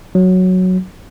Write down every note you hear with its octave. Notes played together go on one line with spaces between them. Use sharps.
F#3